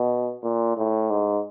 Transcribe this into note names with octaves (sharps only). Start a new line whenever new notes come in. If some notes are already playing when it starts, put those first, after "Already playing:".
Already playing: B2
A#2
A2
G#2